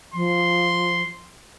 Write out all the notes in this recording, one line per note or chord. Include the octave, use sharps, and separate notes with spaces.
F3 C6